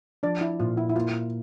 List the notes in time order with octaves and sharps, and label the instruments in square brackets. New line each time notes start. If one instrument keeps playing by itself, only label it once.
[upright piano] F3 [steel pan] D4 D5
[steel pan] E4
[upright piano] A#2 [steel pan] F4
[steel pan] E4
E4
[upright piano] A#3 [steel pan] F4